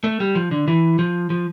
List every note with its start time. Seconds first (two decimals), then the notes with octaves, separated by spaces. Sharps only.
0.04 A3
0.20 G3
0.35 F3
0.51 D3
0.68 E3
0.99 F3
1.30 F3